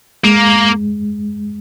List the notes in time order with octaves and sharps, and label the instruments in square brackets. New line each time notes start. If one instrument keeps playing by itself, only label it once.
[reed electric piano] G#3 [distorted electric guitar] A#3